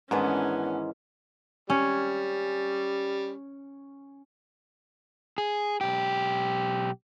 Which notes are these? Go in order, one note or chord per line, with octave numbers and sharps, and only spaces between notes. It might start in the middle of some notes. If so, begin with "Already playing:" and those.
G#2 D#3 E3 G#3 B3 C#4 D4
G3 C#4
G#4
B1 G4